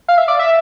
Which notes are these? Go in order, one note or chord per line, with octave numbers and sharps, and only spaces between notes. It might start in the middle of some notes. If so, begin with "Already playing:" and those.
F5
E5
D5
E5